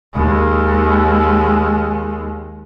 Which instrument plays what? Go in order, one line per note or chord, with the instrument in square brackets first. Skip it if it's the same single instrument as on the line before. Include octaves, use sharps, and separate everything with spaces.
[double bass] D#2 G#3